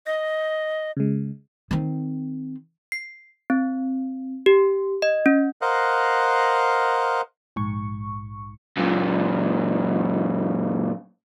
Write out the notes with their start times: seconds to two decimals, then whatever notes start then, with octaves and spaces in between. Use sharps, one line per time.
0.07 D#5 A#6
0.97 C#3 G#3
1.71 D#3 C4
2.92 C7
3.50 C4
4.46 G4
5.02 D#5
5.26 C#4
5.62 A#4 C5 D#5 F5 F#5 F#6
7.56 A#1 G#2 C#6
8.77 F#2 A#2